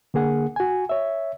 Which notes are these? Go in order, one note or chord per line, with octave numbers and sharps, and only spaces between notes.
D3 A#3 G#4 F#5
F#4 G#5
C#5 E5